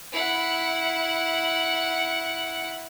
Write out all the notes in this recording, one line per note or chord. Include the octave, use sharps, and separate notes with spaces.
E4 F#5